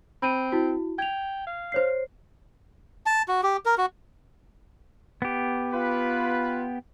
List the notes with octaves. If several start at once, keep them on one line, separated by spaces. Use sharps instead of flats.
C4 B5 D#7
E4 F#4
G5 G#6 F7
F5
C5 C#5 C7
A5
F#4
G4
A#4
F#4
B3 G4
F4 B4